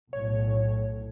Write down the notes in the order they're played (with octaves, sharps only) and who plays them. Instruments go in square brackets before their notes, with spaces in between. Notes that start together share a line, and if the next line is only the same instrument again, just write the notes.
[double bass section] B1 A2 [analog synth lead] C#5